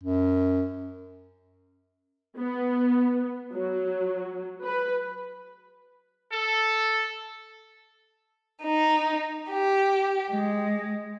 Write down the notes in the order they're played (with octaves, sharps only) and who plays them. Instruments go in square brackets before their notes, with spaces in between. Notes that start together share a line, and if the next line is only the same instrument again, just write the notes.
[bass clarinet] F#2
[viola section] B3
F#3
B4
[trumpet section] A4
[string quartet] D#4
G4
G#3